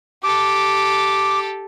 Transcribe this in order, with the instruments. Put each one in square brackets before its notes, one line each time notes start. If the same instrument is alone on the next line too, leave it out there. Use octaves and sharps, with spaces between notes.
[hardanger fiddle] G4 A4 [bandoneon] D6